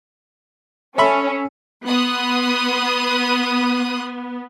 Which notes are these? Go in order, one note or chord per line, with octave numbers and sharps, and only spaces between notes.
C#4 A4 E5 B5
B3 C6 D#6 F#6